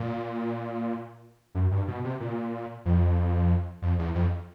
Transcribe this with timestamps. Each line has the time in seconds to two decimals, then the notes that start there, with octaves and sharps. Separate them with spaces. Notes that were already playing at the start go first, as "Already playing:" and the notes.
Already playing: A#2
1.55 F#2
1.71 G2
1.88 B2
2.04 C3
2.20 A#2
2.85 F2
3.82 F2
3.99 E2
4.15 F2